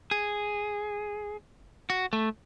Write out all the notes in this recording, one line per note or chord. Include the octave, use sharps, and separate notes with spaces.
G#4
F#4
A3